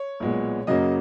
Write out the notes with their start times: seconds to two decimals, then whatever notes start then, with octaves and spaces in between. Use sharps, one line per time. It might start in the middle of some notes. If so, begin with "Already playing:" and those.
Already playing: C#5
0.20 B1 A#2 G#3 B3
0.67 F#2 C#3 F#3 A#3 C#4 D#5